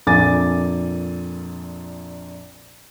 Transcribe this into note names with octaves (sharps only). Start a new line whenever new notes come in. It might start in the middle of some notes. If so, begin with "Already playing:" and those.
A#1 F2 A#2 G#5 D6 A6